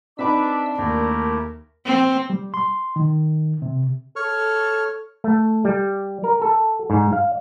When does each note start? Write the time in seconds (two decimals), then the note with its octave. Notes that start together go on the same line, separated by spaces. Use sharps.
0.19 C4 D4 D#4 B4 E5 B5 D6 E6
0.78 D#2 A3 E4 G4 A#4
1.86 C4
2.30 G3
2.54 C6
2.96 D#3
3.62 C3
4.16 A4 C#5 C#6 F6
5.24 A3
5.65 G3
6.24 A#4
6.42 A4
6.90 G#2
7.13 F5